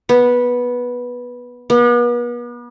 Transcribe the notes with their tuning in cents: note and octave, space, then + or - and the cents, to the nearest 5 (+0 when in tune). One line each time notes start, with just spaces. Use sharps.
B3 -10
B3 -40